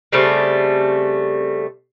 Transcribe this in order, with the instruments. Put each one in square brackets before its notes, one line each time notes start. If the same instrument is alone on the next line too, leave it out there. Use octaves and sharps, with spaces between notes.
[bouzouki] C#3 G3 A3 C4